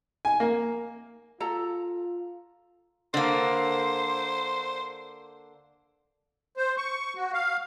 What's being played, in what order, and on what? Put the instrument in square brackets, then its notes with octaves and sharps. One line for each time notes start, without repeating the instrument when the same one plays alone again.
[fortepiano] G#5
A#3
[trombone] F4 [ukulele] A4 A#5
[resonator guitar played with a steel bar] D3 A#3 [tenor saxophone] C5
[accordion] C5
C#6
F#4
F5